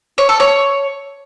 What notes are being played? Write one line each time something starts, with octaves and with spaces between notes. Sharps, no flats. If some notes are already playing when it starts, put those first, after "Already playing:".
C#5
A4
C#5